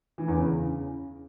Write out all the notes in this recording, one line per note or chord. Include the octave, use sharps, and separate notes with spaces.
E3
E2
C#3